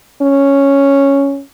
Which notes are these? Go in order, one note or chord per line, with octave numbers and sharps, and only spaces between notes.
C#4